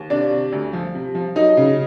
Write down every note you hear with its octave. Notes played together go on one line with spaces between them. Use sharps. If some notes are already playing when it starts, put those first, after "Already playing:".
Already playing: D#2
C3 D4 D5
C3
D2
F3
C3
F3
F#3 D#4 D#5
C#3